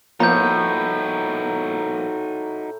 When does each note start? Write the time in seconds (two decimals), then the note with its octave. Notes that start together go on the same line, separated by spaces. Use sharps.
0.20 A2 F3 A#3 B3 D#4 F#4 A#5 G6